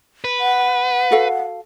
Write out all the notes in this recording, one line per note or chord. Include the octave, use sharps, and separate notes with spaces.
B4
F#5
F#4 A4 F5